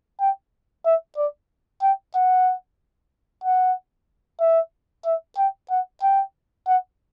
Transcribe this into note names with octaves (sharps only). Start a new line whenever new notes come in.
G5
E5
D5
G5
F#5
F#5
E5
E5
G5
F#5
G5
F#5